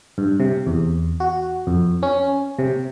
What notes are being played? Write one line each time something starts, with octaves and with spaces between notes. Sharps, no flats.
G2
C3
E2
F#4
F2
C#4
C3